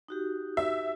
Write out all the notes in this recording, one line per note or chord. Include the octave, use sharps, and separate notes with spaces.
D#4 F#4 G4
E5